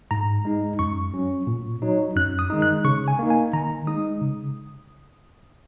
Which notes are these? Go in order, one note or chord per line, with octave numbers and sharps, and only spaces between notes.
G#2 A#5
G#3 D#4
F#2 C#6
F#3 C#4
A#2
F#3 D#4
F#2 F#6
D#6
D#3 G#3 D#4
F#6
C#3 C#6
G#5
A#3 D#4
G#5
D#3 A#5
G#3 D#4 D#6
C#3